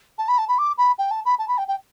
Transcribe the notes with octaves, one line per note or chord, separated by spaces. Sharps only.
A5
B5
A5
B5
D6
B5
G5
A5
B5
A5
B5
G5
G5